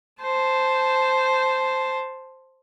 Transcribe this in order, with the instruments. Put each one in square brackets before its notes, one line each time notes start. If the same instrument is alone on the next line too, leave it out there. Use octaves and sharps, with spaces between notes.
[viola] C5 A5